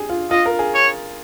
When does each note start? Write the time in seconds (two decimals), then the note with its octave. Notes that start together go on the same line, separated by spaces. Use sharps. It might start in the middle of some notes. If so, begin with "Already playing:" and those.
Already playing: G4 G#4
0.09 F4
0.31 F4 D#5
0.46 A#4
0.59 G#4
0.74 C#5